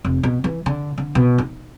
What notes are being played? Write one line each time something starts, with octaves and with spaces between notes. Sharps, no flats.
F1
B2
E3
D3
D3
B2
D#4